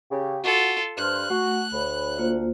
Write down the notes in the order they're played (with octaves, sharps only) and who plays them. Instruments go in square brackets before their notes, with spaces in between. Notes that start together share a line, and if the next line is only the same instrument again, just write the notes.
[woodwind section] C#3 G4
[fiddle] F4 A4 [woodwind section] F#4
[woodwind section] G2 C5 F6 [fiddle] F#6
[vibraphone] A3 [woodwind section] F#4
[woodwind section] D2 [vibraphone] C#5 B5
[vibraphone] A#3 F4 C5